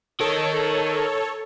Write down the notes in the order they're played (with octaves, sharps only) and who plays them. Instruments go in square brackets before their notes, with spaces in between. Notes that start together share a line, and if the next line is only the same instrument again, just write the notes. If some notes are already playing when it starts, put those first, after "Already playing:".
[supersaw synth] A4 C#5 [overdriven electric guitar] A#4 D#5